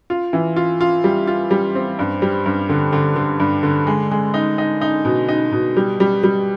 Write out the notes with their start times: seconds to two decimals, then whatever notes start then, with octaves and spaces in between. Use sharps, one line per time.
0.10 F4
0.33 E3
0.56 F4
0.81 F4
1.04 G3
1.27 F4
1.51 G3
1.75 C4
1.99 G2
2.22 G3
2.46 G2
2.69 D3
2.93 D3
3.16 D3
3.40 G2
3.63 D3
3.87 G#3
4.11 G#3
4.34 D#4
4.58 D#4
4.81 D#4
5.05 B2
5.28 D#4
5.52 B2
5.77 G3
6.00 G3
6.23 G3